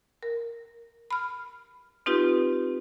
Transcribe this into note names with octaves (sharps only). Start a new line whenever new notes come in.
A#4
B5 F6
C4 D#4 F4 G4 B4